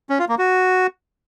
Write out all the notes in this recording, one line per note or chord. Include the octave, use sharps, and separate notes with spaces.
C#4
F4
A#3
F#4